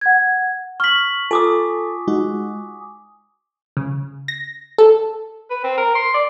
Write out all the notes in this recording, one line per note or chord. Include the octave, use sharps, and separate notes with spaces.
F#5 G#6
C#6 F6 B6 F#7
F4 A4 G#5 D6 D#6
G#3 D#4 F#4
C#3
A#6
A4
B4
C4
A#4
C6
D5